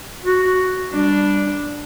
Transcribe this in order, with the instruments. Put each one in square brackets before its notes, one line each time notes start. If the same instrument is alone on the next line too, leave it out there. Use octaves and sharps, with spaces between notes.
[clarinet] F#4
[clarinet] G3 [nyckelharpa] D4